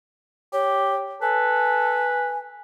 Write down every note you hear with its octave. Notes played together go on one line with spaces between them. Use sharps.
G4 C#5
A4 B4 G#5